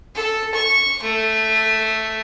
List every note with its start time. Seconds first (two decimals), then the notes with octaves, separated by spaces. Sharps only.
0.15 A4
0.54 C#6
1.02 A3